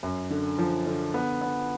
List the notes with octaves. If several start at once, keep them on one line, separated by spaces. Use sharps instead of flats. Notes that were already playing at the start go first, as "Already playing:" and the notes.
F#2
D3
F3
D3
B3
B3